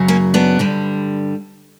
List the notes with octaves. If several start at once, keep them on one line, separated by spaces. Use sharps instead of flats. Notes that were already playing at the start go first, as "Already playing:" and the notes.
Already playing: F#2 C#3 F#3
A#3 C#4
B3 D4
G2 D3 G3